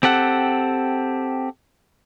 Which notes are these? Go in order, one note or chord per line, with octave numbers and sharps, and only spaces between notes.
C4 G4 A4 F#5